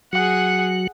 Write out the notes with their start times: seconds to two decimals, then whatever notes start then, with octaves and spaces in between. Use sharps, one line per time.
0.13 F#3 F#4 G#4 F#5